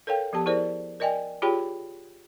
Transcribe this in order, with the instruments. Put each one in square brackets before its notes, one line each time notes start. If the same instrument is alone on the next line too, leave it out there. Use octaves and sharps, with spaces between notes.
[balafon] A4 A#4 C#5 F5 G5
F3 B3 G4 A5
E4 G#4 A#4 C5 D5
A#4 D5 D#5 G5 G#5
F4 G4 G#4 C#5 G5 B5